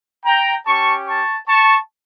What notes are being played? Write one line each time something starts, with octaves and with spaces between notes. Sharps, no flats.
G5 A#5
C#4 G4 A5 C#6
A5 C#6
A5 C#6